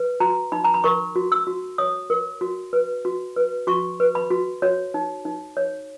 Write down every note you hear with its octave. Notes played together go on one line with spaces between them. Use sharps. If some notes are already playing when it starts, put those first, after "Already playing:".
Already playing: B4
F#4 A#5
D#4 B5
A#5
B5
A#4 C#6
F#4
E6
F#4
C#5 D#6
A#4
F#4
B4
F#4
B4
F#4 C#6
B4
B5
F#4
F#4 C#5
D#4
D#4
C#5